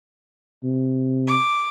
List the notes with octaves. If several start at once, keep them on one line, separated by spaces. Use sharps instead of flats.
C3
D6